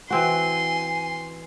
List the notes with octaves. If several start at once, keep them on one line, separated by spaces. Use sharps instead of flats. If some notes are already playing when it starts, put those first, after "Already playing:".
E3 C4 F#4 G#5 C6